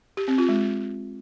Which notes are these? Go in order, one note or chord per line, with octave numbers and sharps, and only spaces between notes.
G4
C4
F4
G#3